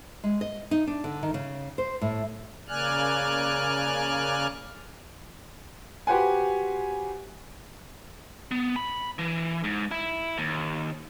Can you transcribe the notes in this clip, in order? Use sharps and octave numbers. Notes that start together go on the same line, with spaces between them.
G#3
D#5
D#4
D4
D3
D#3
C#3
C5
A2
C#3 A#3 D5 G#5 F6 F#6
F#4 G4 B4 C5 F#5 G#5
B3
B5
E3
G#2
E4
D#2